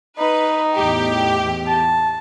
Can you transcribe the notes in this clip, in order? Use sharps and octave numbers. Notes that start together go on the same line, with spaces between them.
D#4 B4
E2 A2 G4
A5